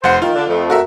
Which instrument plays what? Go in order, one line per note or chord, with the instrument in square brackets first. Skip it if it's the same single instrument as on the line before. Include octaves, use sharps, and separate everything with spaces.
[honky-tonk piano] F1 F#5 [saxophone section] C5
[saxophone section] D#3 [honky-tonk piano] F4
[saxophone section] D3 D4
F2 A3
[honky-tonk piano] F#4 A#4 E5